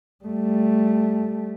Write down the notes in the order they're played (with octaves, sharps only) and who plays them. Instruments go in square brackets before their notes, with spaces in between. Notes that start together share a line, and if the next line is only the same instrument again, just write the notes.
[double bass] G3 A3